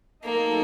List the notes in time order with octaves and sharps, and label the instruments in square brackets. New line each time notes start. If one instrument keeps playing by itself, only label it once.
[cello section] F#3 A3 D#4 A4 D#5 [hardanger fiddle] A#3